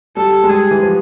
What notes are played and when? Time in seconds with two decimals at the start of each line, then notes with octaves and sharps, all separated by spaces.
0.17 G3 A4
0.44 G#3
0.49 G3 G#4
0.71 E3
0.82 F3